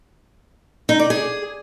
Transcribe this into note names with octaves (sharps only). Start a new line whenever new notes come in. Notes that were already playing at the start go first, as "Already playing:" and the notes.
D#4
D5
G#4